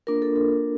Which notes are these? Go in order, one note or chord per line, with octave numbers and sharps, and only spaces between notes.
A#3 D4 F4 A#4
A4
A4